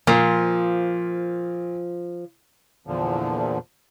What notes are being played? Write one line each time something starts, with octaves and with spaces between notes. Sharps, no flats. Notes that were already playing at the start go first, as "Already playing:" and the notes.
A#2 F3
E2 A#2 D3 F3